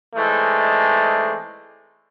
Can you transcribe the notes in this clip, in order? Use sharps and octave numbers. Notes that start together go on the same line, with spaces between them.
E3 G#3 A3 C4 D#4 D5